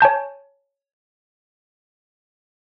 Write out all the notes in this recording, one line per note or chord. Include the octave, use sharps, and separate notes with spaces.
C#5 G#5 A5 G6